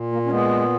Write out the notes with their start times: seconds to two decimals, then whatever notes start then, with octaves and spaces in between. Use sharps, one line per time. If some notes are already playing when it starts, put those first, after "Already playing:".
Already playing: A#2
0.12 A#3
0.26 C#4
0.30 G#3 B3